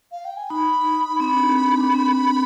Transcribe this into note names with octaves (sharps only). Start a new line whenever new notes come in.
F5
G5
G#5
D#4 B5
D#4
C4 B5
D4
C4
D4
C4